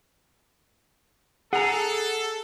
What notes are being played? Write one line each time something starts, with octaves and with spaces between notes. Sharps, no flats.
G#4 A4 F#5 A#5